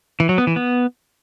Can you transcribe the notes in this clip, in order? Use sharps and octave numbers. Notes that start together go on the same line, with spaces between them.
E3
F#3
B3
E3
B3